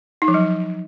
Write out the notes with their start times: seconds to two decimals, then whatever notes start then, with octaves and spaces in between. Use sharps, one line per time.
0.22 D#4
0.28 F3
0.34 F#3